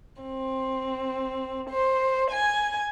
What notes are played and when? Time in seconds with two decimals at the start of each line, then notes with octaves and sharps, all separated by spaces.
0.22 C4
1.69 C5
2.30 G#5